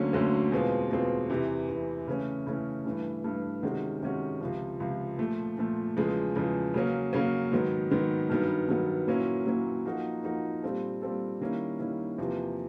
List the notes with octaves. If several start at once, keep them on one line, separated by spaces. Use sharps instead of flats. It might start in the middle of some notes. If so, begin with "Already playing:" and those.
Already playing: D2 D3 F#3 A#3 C#4
D2 D3 F#3 A#3 C#4
E2 B2 G#3 C4 F4
E2 B2 G#3 C4 F4
E2 C3 E3
E2 C3 E3
C#3 E3 A3 C#4
C#3 E3 A3 C#4
G2 E3 A3
G2 E3 A3
C3 D#3 G#3 C#4 F#4
C3 D#3 G#3 C#4 F#4
C#2 C3 F3
C#2 C3 F3
A#2 F3 A3
A#2 F3 A3
E2 C#3 F3 G#3
E2 C#3 F3 G#3
C#3 F#3 A#3 C#4
C#3 F#3 A#3 C#4
G#2 D#3 F#3 B3
G#2 D#3 F#3 B3
G2 D#3 F#3 B3
G2 D#3 F#3 B3
A#2 F#3 A#3 C#4 E4
A#2 F#3 A#3 C#4 E4
F3 A#3 D#4 F#4
F3 A#3 D#4 F#4
A#2 G3 C4 F4 A4
A#2 G3 C4 F4 A4
D#3 G3 A#3 C#4 E4
D#3 G3 A#3 C#4 E4
E2 C3 F3 A#3